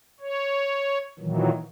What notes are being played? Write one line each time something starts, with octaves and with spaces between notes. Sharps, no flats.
C#5
A#2 D#3 E3 F#3